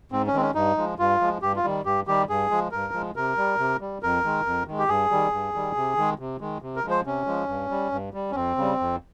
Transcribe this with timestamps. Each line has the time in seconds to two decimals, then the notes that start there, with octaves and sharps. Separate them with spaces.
0.12 G#2 C4
0.27 C#4
0.34 D#3 G#3 C4
0.41 C#4
0.55 G2 D#4
0.77 F3 G#3
0.99 G2 F4
1.21 F3 G#3
1.42 G2 G4
1.56 F4
1.64 D#3 G3
1.85 G2 G4
2.07 D#3 G3 G4
2.29 G2 G#4
2.51 F3 G#3
2.72 G2 A#4
2.93 F3 G#3
3.16 C3 A#4
3.38 G3
3.58 C3
3.81 G3
4.03 F2 A#4
4.24 D#3 G#3
4.46 F2
4.67 D#3 G#3
4.78 G4
4.88 G2 G#4
5.11 D#3 G3
5.32 G2
5.55 D#3 G3
5.76 C3
5.97 D#3 G#3
6.19 C3
6.41 D#3 G#3
6.62 C3
6.76 A#4
6.84 F3 G#3
6.91 C5
7.05 C3 C#4
7.27 F3 G#3
7.48 G2
7.71 G3
7.92 G2
8.14 G3
8.31 C#4
8.35 F2 C4
8.57 C#3 G3
8.80 F2